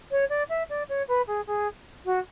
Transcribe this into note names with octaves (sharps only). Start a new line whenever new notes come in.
C#5
D5
E5
D5
C#5
B4
G#4
G#4
F#4